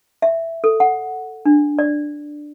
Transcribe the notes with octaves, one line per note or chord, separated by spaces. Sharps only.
E5
A4
F#5
D4
D5